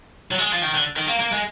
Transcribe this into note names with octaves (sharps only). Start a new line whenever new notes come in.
F#3
G#3
F3
D#3
D3
D#3
A#3
A#3
G#3